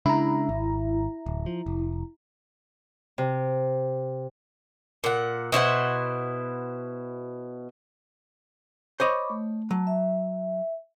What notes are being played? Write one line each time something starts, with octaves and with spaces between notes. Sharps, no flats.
C#3 G#3 D4 E4 A#5
G#1
D1
F3
F1
C3
A#2 F#5
B2 E4 C5 F#5
C5 C#5 D#5 B5 C#6 D6
A3
F#3 A5
E5